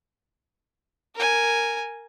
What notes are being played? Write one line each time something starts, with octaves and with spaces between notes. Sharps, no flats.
A#4 G#5